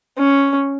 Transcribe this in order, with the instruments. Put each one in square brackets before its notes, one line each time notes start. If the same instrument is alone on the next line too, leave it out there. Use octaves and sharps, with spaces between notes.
[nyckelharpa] C#4